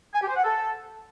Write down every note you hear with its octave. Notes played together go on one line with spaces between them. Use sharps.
G#5
G4
C5
F#5
A4